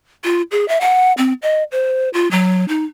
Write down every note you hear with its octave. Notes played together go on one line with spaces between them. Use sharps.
F4
G#4
E5
F#5
C4
D#5
C5
F4
F#3
D#4